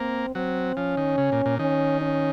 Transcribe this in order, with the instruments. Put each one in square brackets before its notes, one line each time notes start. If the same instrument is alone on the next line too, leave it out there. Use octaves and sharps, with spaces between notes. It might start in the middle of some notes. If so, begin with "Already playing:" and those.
Already playing: [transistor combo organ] A#3 [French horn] C4
[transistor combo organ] F#3 [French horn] C4
[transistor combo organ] F3 [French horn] C#4
[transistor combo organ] D#3
C#3
A#2
A#2
[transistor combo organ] D#3 [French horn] C#4
[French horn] C#4